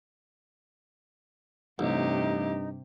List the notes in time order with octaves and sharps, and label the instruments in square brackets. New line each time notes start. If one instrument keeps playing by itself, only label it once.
[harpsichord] A1 [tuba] G2 [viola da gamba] C3 G4 [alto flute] D#4